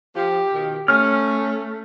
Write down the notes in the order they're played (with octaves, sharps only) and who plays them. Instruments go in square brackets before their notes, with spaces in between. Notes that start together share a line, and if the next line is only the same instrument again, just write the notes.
[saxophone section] F3 [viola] G4
[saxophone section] B2 D#3
[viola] A3 [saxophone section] C#4 [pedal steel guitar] F6